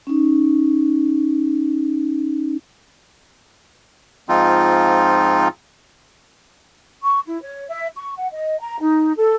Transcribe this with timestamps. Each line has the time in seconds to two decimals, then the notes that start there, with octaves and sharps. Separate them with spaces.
0.07 C#4 D#4
4.29 G#2 F3 C4 D#4 F4
7.02 C#6
7.26 E4
7.41 C#5
7.69 E5
7.96 C#6
8.17 F#5
8.32 D#5
8.60 A#5
8.80 D#4
9.16 A4